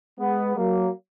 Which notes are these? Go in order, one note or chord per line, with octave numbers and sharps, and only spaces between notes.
G#3 B3
F#3 A#3